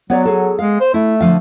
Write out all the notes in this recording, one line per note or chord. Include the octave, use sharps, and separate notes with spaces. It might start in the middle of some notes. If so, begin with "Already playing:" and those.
F#3 B3 C#5 D5
G#4 A4
G#3 F5
C5
A3 E4
D3 F3 F5